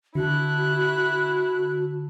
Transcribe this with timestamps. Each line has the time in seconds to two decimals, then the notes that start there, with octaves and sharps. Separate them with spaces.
0.15 D3 E4 F#4 A5 F#6